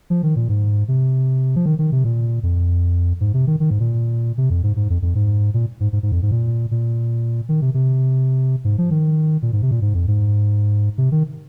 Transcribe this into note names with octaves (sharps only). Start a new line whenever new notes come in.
F3
D#3
A#2
G#2
C3
F3
D#3
D#3
C3
A#2
F2
G#2
C3
D#3
D#3
G#2
A#2
C3
F2
G#2
G#2
F2
F2
G#2
A#2
G#2
G#2
G#2
F2
G#2
A#2
A#2
D#3
C3
C3
G#2
F3
D#3
A#2
G#2
C3
A#2
G#2
F2
G#2
C3
D#3